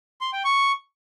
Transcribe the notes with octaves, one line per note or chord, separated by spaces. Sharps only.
C6
G5
C#6